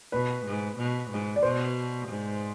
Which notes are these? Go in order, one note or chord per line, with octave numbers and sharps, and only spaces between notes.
B2 B4
G#2
B2
G#2
D5
B2 C5
G#2